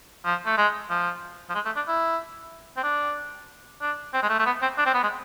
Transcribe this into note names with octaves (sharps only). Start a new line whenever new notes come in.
F3
A3
G#3
F3
F3
G#3
A3
D4
E4
C4
D4
D4
C4
G#3
A3
A3
B3
C4
D4
C4
B3
G#3